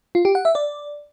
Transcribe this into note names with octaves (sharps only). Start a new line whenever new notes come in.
F4
G4
F#5
E5
D5